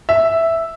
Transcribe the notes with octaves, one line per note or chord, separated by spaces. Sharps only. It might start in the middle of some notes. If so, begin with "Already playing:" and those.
E5